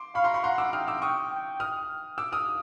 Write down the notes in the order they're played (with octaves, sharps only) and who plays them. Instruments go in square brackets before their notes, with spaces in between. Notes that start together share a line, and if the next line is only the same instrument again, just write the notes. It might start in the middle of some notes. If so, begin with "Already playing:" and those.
Already playing: [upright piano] C6 D6
[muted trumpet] F5 [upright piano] B5 C#6
[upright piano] A#5 C6
B5 C#6
[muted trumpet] F#5 [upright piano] A#5 C6
[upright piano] D6 E6
[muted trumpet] G5 [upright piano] D#6 F6
[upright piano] D6 E6
[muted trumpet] G5 [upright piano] C#6 D#6
[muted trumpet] G5
[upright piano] D#6 F6
D6 E6
D#6 F6